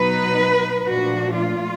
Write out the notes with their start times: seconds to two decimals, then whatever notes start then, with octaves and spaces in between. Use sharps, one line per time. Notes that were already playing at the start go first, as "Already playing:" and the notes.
Already playing: B2 F#3 B3 D#4 B4
0.87 A#2 F3 A3 D4 F#4
1.36 F4